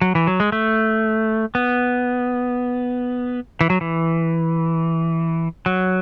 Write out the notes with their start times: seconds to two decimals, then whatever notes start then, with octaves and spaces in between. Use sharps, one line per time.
0.01 F#3
0.15 E3
0.27 F#3
0.40 G#3
0.52 A3
1.55 B3
3.61 E3
3.70 F#3
3.81 E3
5.66 F#3